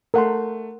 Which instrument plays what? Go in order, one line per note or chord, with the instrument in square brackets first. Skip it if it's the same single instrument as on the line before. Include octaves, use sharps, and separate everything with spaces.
[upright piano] A3 [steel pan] A#4 F#5 C6